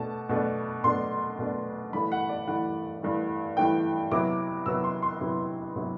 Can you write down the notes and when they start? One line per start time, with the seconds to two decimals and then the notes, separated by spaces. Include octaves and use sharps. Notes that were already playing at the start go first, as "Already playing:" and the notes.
Already playing: B2 A3 D4 A5
0.29 B2 A3 D4
0.84 B2 A3 D4 C6
1.39 B2 A3 D4
1.93 G2 E3 A3 B5
2.12 F#5
2.29 D5
2.47 G2 E3 A3 F#5
3.02 G2 E3 A3
3.57 G2 E3 A3 G5
4.12 C3 F#3 B3 E4 D6
4.66 C3 F#3 B3 E4 E6
4.84 C6
5.02 C6
5.21 C3 F#3 B3 E4
5.76 C3 F#3 B3 E4